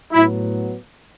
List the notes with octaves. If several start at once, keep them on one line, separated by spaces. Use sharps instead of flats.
A2 F#3 B3 E4